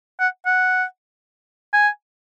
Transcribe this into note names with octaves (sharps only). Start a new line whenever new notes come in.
F#5
F#5
G#5